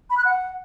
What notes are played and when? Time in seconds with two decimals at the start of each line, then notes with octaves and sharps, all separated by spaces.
0.10 B5
0.18 F#6
0.25 F#5